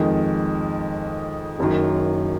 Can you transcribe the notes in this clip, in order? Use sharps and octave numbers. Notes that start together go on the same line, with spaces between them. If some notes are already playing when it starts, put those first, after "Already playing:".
Already playing: F2 D#3 G#3
F#1 F#2 D#3 F#3